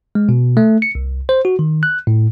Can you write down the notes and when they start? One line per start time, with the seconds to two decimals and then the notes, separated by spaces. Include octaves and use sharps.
0.15 G#3
0.29 B2
0.57 A3
0.82 C#7
0.95 C2
1.29 C5
1.45 F#4
1.59 D#3
1.83 F#6
2.07 A2